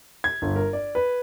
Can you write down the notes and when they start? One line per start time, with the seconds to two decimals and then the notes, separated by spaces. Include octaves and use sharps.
0.24 G#6
0.42 G1
0.56 A#4
0.73 D5
0.95 B4